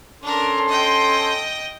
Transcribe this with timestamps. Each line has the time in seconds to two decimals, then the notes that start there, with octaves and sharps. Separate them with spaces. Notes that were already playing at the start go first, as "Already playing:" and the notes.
0.23 C#4 D4 A4 A#4 C6
0.68 D#5 G5